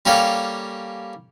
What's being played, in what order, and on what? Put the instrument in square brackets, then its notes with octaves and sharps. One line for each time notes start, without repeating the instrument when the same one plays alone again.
[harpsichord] G3 A#3 C#4 G4 A4 F5